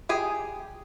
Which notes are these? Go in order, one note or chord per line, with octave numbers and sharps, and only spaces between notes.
G4 G#4 G#5